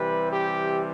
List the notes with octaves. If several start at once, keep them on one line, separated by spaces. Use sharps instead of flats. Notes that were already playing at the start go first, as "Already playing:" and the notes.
Already playing: C3 E3 G3 B4
G4